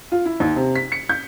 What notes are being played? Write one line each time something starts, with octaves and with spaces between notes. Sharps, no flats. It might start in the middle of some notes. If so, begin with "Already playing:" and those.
F4
E4
D#2
C3
B6
C#7
G6